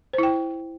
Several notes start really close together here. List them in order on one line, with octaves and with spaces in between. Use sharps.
C5 E4 G5